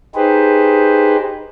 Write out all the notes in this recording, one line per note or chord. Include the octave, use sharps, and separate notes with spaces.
D#4 G4 G#4 B4 C5